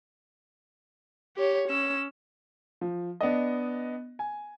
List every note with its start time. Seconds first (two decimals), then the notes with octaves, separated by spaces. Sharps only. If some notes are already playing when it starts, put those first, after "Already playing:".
1.37 G4 C#5
1.69 C#4 E6
2.81 F3
3.21 B3 D4 D#5
4.19 G#5